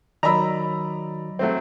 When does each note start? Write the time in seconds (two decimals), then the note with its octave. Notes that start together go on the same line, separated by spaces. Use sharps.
0.23 D#3 F#3 D5 D#5 A#5 B5 E6
1.39 F#3 A3 C4